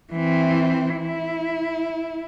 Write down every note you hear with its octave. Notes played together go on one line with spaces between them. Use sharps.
E3 C4
E4